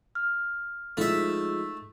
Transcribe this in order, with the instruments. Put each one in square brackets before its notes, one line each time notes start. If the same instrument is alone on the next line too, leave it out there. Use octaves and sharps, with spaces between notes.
[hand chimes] F6
[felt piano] F3 G#3 D#4 [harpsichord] A3 E5